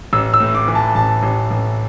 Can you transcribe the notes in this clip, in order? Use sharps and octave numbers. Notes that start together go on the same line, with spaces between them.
A1 E6
E6
A2
D6
E3
A5
A1 A5
A1
A1